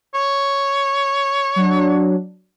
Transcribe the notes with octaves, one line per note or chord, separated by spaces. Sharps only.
C#5
F#3 D4